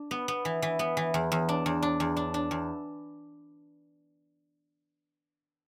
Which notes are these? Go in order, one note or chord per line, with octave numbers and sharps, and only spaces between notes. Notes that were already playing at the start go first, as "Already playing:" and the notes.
Already playing: D4
B3
B3
E3
E3
B3
E3
E2
E2
D4
E2
D4
E2
D4
D4
E2